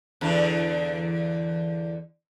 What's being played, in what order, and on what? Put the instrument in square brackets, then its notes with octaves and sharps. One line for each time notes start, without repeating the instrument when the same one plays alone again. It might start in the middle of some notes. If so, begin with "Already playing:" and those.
[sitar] E2 D3 D4